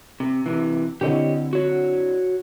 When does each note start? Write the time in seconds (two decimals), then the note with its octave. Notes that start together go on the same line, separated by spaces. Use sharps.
0.20 C3
0.46 C3 E3
1.01 D3 C4 E4 G4 C#5 D#5
1.53 F#4 C#5